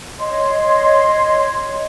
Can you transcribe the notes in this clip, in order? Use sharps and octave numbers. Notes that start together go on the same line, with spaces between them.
C#5 D#5 C6